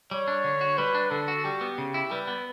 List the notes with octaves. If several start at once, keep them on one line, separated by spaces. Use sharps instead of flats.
G3 C#5
D4
D3
F#4
G3 B4
D4
D3 A4
F#4
G3 G4
B3
C#3
E4
G3 B4
B3